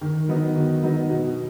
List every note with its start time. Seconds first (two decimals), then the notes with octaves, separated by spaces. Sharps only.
0.01 D#3
0.28 F#3 B3 D#4
0.55 D#3
0.83 F#3 B3 D#4
1.10 B2